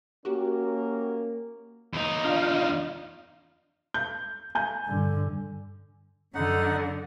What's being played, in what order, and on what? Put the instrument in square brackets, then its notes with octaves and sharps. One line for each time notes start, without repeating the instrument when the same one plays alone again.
[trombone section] A#3 C#4 A#4 [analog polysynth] F#4 G4
[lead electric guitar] E2 D#4
[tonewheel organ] D4 F4 F5
[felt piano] G6
G#5 G6
[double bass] G2 D3
[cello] F#2 D3 [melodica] D#4 F#5